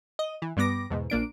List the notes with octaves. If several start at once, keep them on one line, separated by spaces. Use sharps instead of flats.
D#5
E3
G2 G3 B3 D6 A#6
E2 G#2 B2
A#1 A#3 D4 D7